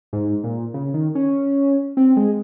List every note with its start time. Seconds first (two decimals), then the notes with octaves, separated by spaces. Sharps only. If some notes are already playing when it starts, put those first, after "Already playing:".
0.13 G#2
0.44 A#2
0.74 C#3
0.94 D#3
1.15 C#4
1.97 C4
2.17 G#3